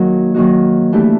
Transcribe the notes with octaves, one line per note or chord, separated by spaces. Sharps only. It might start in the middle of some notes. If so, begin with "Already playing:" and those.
Already playing: D#3 F#3 A#3 D#4 F#4
D#3 F#3 A#3 D#4 F#4
E3 A3 D4 G4